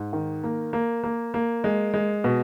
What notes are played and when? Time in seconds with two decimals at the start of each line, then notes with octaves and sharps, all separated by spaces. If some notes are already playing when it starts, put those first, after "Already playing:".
Already playing: G#2
0.13 D#3
0.44 A#3
0.73 A#3
1.04 A#3
1.34 A#3
1.64 G#3
1.94 G#3
2.24 B2